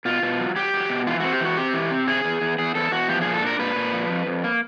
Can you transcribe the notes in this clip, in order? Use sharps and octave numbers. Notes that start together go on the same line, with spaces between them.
B2 F4
B2
F#3
F#3 G4
F#3
B2
E3 F4
C4 F#4
G4
E3 F#4
C4 G4
E3
C4
C3 G#4
E2
E2
E2 G#4
E2 A4
E2 F#4
F3 G4
A#2 G#4
A4
D4 A#4
A#2 B4
A#2
F3
F2
F2
A#3